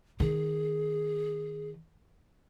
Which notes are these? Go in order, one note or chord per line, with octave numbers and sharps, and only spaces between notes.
D#3 G#4